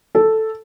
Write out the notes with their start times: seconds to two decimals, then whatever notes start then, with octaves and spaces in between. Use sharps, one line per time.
0.15 A4